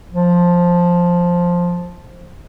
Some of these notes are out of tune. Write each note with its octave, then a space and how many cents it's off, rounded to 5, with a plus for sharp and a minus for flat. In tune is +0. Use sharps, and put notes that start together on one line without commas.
F3 +5